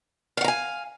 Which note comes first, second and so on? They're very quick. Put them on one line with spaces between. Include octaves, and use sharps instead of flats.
F5 F#5 A#5 G#5